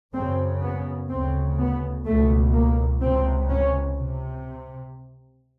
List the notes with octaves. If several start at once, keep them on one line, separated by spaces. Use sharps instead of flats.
F#2 C#3 C4
B3
D2 C#3 C4
B3
C#2 B2 A3
A#3
C#2 C3 C4
C#4
C3